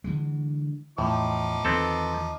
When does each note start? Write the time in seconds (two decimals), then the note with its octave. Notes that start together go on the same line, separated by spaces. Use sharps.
0.04 D3 E3 G#3
0.98 E2 A2 F3 D#4 D6
1.65 E2 D#3 B3 C4 A4